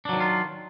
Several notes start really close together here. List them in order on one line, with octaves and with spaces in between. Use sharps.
D4 F#3 E3 D#3 F4